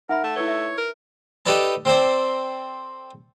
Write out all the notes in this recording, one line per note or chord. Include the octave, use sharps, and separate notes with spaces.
D#4 A#4 E5 F#5 B5
A3 A5
E4 B4 C#5 E6 G7
E5
A#4
D#4 G4 A4 B4 D5 A5
C4 A4 C5 D5